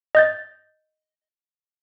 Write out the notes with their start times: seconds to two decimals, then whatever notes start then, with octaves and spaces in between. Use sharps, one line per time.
0.15 D#5 G6 A6